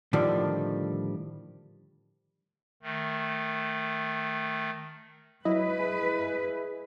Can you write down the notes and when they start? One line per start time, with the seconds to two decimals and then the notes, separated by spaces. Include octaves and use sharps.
0.13 A2 D3 D#3 F3 G3 D4
2.83 D#3 A3
5.45 F#3 E4 B4 D#5
5.79 G#4